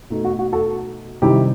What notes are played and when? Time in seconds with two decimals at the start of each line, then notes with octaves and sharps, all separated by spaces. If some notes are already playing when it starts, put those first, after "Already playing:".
0.10 B2 A3 D#4
0.24 F#4
0.39 F#4
0.52 F#4 A4
1.22 C3 D#3 G3 C4 D#4 E4 G4